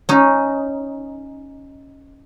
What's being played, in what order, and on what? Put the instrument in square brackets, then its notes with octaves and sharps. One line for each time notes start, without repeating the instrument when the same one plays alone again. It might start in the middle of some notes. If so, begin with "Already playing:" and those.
[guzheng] C#4 D#4